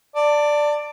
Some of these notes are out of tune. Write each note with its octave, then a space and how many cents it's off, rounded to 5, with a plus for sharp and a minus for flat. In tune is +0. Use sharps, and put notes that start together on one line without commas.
D5 +5 A5 +25